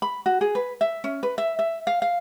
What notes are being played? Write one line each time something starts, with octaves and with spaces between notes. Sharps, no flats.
B5
F#4
G#4
B4
E5
C#4
B4
E5
E5
F5
F5